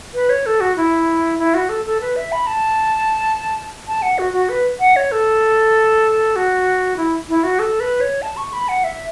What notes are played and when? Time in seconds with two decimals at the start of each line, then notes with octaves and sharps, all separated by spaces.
0.15 B4
0.30 C#5
0.46 A4
0.60 F#4
0.77 E4
1.39 E4
1.54 F#4
1.69 A4
1.86 A4
2.01 B4
2.16 E5
2.32 B5
2.47 A5
3.88 A5
4.02 F#5
4.19 F#4
4.33 F#4
4.49 B4
4.80 F#5
4.96 C#5
5.12 A4
6.36 F#4
6.97 E4
7.29 E4
7.44 F#4
7.59 A4
7.80 B4
8.01 C#5
8.22 A5
8.37 C#6
8.53 B5
8.69 F#5
8.84 E5